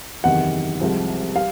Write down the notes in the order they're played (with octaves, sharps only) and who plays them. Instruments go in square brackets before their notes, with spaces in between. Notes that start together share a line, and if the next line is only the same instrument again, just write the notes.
[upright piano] F#1 E2 C3 D#3 F#5
C2 C3 F3 G#3 C4
G3 F5